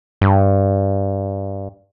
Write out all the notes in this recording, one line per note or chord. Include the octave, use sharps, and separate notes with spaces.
G2